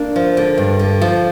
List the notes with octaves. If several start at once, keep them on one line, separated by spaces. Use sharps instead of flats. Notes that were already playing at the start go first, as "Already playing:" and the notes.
Already playing: A#3 D4
F3
D3
G2
D3
F3